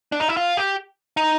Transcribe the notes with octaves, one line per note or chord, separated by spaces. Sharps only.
D4
D#4
E4
F4
G4
D#4